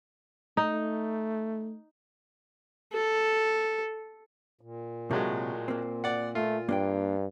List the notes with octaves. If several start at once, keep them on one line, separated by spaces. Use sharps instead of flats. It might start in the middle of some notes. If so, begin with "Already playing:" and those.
A3 D#4
A4
A#2
A2 C3 F#3 G#3 A#3
A#3 C4
D5 F#5
A3 F4
G2 A#3 D4 G5